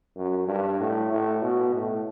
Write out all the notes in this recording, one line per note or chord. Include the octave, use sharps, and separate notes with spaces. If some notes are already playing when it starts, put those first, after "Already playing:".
F#2
G2
A2
A2
B2
A2